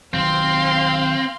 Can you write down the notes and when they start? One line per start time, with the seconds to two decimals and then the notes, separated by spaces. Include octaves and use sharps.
0.14 D#3 F#3 C4 F5 C6